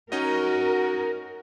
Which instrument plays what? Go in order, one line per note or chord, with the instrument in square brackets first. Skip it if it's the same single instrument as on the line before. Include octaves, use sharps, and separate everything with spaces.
[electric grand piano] C#4 D#4 D#5 [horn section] F#4 [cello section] A#4